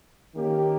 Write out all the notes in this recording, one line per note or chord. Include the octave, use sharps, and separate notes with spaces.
D#3 A#3 C#4 G4